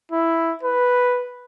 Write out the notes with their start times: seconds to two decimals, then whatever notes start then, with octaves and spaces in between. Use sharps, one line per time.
0.12 E4
0.63 B4